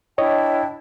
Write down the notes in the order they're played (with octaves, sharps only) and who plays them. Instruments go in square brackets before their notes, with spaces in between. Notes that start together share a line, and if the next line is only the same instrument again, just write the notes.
[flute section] D4 E4 G5 [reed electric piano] C#5 D#5